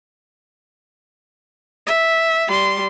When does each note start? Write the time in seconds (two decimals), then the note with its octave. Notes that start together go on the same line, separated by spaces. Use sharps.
1.87 E5
2.48 G3 C6